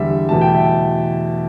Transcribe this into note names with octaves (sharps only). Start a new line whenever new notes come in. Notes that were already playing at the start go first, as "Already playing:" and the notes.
Already playing: E2 D3 G3 E5
E2 B2 A3 A5
G5
E5